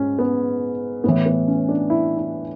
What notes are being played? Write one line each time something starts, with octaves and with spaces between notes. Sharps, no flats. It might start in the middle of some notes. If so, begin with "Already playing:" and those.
Already playing: G#2 C#4
B3
A2 E3 B3
B3
C#4
D4
E4
E4